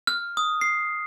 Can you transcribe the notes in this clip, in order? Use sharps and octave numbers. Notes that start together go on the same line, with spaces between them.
F6
D#6
C7